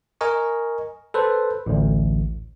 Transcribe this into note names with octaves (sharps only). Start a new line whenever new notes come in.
A#4 D#5 G#5 C#6
A4 B4 C5
A1 D2